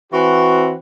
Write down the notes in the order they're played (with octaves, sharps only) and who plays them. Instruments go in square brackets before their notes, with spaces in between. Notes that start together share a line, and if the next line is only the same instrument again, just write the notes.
[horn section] E3 C4 F#4